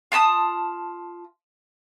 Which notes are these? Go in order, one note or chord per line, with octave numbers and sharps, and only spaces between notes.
F4 A5 B5 D#6